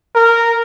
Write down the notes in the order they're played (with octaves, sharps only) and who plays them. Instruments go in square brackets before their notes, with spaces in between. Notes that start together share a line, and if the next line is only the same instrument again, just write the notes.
[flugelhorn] A#4